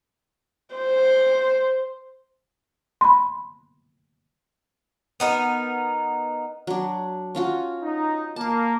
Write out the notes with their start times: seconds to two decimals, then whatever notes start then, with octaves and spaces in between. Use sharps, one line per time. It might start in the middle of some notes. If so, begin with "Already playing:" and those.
0.75 C5
3.01 B5 C6
5.20 B3 D#4 A#4
6.67 F#3 D4
7.35 C#4 F4 F#4
7.82 D#4
8.36 A#3 A5 D6